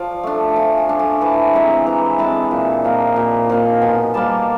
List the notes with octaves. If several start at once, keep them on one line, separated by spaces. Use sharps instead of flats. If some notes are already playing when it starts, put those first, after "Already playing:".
Already playing: F3 D5
A3 D4
F3 G#5
G#5
A3 D4
G#5
E3 A5
G#3 C4 E4 A#5
E3 A#5
G#3 C4 E4 A5
A#2
F3 A#3 D#4
A#2
F3 A#3 D#4
B2 G#5
G3 A#3 A5